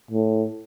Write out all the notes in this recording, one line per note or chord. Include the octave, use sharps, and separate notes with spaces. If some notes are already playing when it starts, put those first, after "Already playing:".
A2